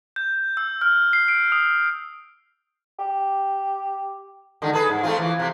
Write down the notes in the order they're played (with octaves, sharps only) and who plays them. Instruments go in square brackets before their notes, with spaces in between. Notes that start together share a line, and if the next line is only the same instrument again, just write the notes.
[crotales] G6
E6
F6
C7
D7
D#6
[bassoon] G4
[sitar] D3 D#3 G#3
G#4 A4 B4
G#2
A3 C4 F4
E3 F3
C3 C4